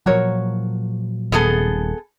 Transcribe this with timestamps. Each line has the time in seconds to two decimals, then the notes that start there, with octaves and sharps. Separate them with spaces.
0.06 A#2 F3 F#3 F#4 A#4 C#5
1.32 D#1 B3 G#4 A4